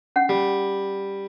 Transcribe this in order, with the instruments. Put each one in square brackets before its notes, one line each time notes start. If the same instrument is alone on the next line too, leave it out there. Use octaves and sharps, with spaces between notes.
[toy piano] C#4 F#5
[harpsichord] G3